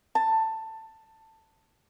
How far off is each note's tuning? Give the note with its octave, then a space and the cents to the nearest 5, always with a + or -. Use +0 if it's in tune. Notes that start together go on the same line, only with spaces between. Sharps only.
A5 +15